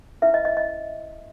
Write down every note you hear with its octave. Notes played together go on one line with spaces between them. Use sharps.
C#4 E4 B4 E5
D#5
D#5
D#5